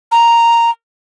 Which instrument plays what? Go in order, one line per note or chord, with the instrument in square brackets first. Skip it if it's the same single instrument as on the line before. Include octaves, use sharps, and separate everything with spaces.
[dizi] A#5